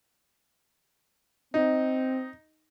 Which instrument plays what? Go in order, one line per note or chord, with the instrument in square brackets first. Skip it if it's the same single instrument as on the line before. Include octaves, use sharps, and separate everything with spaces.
[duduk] C4 [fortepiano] D#4